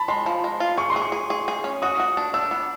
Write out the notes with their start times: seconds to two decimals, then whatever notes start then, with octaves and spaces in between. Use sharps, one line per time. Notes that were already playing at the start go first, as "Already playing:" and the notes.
Already playing: A5 B5
0.08 G#3 C6
0.26 F3
0.44 G#3
0.60 F4
0.77 G#4 C#6
0.90 C6
0.96 G#4
1.02 C#6
1.12 G#4
1.30 G#4
1.48 G#4
1.64 C#4
1.82 F#4 D#6
2.00 F#4
2.17 D4
2.34 D4 E6
2.51 B3